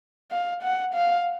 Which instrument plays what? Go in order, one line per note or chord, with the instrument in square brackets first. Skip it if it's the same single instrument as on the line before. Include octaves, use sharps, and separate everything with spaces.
[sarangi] F5
F#5
F5